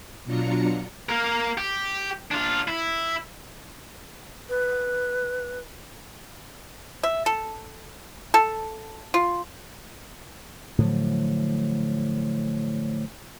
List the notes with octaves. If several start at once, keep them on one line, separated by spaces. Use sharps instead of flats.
B2 F#3 D4 F4 A#5 C#7
A#3 A#4
G4
D4 F4
E4
B4
E5
A4
A4
F4
A2 D3 F3 F#3